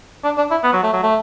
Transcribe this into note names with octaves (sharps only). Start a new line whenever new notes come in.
D4
D4
E4
B3
F#3
A3
F#3
A3